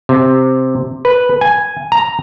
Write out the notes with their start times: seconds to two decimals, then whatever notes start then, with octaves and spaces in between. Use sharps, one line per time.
0.09 C3
1.05 B4
1.41 G#5
1.92 A#5